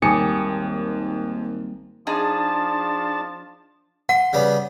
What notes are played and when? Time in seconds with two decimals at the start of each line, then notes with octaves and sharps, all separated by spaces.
0.02 G#1 D#2 G3 A#3 G#5 D#6 C#7
2.07 F3 D4 D#4 G#4 A5
4.09 F#5 C6
4.33 C#3 G3 B3